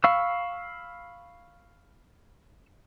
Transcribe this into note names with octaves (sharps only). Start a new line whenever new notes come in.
F5 B5 C#6 E6